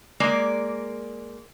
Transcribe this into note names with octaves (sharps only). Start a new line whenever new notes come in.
G#3 A#3 D5